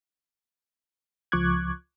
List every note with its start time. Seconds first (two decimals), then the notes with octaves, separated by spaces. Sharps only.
1.32 C#2 F3 C#6 D6 F#6 G#6